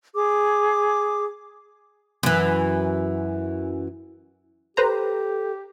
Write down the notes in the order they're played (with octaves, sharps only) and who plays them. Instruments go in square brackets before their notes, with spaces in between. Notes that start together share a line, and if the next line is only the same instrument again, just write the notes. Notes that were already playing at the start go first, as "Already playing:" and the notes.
[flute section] G#4 D6
[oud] F#2 E3
[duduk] G4 [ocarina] A4 [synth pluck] B4 C5 A#5